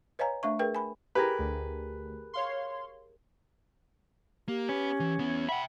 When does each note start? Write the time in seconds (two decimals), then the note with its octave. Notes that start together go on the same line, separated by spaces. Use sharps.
0.19 B4 C#5 D#5 F5 G#5 A#5
0.43 A3 D4 E5 C#6
0.59 G#4 A#4 B4 G5
0.75 G#5 B5
1.15 G4 G#4 A#4 B4
1.39 D2
2.33 C#5 F5 C6
4.48 A#3 G4
4.69 B3 C#4 B4
5.00 E3
5.19 E2 B3
5.49 E5 F#5 G5 B5